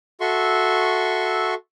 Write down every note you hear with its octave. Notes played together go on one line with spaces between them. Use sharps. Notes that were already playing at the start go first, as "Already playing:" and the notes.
F#4 A4 E5 C6 C#6